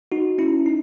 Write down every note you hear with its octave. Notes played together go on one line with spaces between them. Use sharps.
D#4 F#4
C#4 E4
D#4